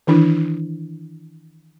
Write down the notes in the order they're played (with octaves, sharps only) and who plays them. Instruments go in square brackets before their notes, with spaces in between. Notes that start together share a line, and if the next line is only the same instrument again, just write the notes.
[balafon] D#3 E3 D4 E4